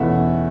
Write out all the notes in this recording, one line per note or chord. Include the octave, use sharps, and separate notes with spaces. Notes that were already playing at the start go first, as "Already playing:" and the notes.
Already playing: E2 B2 A3 C#4 E4 E5 F#5